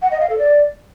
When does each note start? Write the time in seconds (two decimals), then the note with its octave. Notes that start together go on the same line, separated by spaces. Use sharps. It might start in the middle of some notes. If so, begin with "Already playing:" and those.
0.02 F#5
0.11 D#5
0.20 F5
0.29 A4
0.38 D5